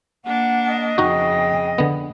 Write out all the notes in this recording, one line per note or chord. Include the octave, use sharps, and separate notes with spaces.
A#3 D4 F#5
D#5
F2 C#3 D#4 F#4 G5
D3 B3